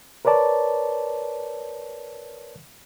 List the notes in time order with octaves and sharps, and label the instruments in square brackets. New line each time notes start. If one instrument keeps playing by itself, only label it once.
[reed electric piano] A#4 B4 C#5 D5 A5